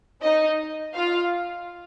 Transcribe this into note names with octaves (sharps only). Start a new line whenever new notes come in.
D#4 D#5
F4 F5